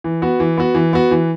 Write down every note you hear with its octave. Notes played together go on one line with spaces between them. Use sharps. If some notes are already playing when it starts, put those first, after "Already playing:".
E3
B3 F#4
E3
B3 F#4
E3
B3 F#4
E3